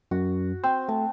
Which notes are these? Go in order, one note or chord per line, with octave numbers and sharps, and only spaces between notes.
F#2 F#4
C4 C5
A3 A5